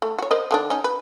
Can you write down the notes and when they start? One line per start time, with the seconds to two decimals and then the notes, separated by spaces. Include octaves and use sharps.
0.02 A3
0.18 F#4 C#5
0.31 A#4 C5 D#5
0.51 D3 D#3 D4
0.70 C#4 D#4
0.84 B4